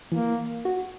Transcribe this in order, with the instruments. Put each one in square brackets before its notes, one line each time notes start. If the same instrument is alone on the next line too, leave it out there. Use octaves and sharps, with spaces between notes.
[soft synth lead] E3 [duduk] A#3
[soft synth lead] F#4